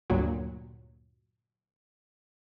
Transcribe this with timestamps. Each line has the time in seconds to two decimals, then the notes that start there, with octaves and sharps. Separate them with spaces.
0.10 D2 G2 A#2 F#3